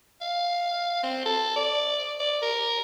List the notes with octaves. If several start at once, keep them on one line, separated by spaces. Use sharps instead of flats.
F5
C4
A4
D5
D5
A#4